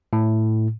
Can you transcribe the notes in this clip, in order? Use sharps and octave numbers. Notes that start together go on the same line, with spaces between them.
A2